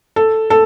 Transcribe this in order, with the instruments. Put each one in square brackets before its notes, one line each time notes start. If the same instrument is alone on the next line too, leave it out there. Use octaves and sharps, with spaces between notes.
[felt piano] A4
A4